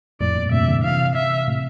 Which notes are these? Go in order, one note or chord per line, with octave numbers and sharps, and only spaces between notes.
F2 A2 D5
G2 A#2
A2 C3 E5
A#2 D3
C3 E3 F5
E5
A2 C3